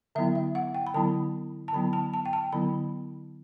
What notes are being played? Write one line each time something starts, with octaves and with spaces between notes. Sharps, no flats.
D3 F#3 B3 E4 E5
E5
F#5
G5
B5
D3 F#3 B3 E4 A5
A5
D3 F#3 B3 E4 B5
A5
A5
G5
A5
D3 F#3 B3 E4 B5